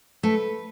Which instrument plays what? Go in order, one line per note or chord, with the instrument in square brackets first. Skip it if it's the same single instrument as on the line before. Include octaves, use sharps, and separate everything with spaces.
[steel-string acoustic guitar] A3 B4